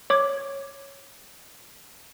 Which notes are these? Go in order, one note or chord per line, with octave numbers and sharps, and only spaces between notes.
C#5 D6 G#6